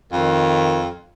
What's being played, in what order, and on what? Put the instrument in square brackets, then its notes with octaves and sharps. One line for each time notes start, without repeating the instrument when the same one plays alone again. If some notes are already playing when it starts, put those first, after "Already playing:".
[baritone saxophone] F2 [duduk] D#3